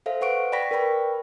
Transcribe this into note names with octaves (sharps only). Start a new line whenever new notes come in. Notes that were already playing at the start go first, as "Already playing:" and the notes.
A4 C5 E5 F5
B4 F#5 C#6 D7
D5 G5 B5 C#6 A#6 B6
A#4 B4 D5 G5 B5 C#6